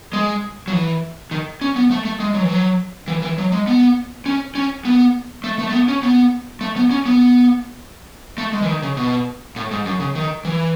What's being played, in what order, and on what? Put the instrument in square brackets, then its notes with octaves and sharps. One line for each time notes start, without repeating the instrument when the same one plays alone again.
[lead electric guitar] G#3
F#3
E3
D#3
C#4
B3
A3
A3
G#3
F#3
E3
F#3
E3
E3
F#3
G#3
B3
C#4
C#4
B3
A3
A3
A3
B3
C#4
B3
A3
B3
C#4
B3
A3
G#3
E3
D#3
C#3
B2
A2
G#2
F#2
C#3
D#3
E3